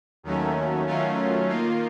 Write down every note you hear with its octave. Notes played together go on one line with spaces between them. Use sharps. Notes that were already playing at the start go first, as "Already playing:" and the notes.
D#2 D#3 F#3 A3 C#4
D#3 F#3 A3 C#4 F4
D#3 A#3 F4